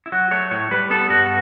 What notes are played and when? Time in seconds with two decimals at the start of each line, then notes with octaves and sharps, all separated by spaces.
0.06 E4
0.12 F#3 F#4
0.31 A3 C#5
0.51 A2 C#5
0.71 G3 B4
0.90 B3 A4
1.09 G2 F#4